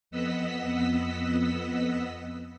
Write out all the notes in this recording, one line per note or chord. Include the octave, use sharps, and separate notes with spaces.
F2 B3 D#5 F#5 E6 B6